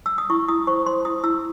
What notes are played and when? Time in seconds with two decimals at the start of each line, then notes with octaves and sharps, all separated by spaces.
0.06 E6
0.18 D#6
0.30 E4 C#6
0.48 E4 D#6
0.67 C5 C#6
0.86 C5 C6
1.05 E4 D#6
1.23 E4 E6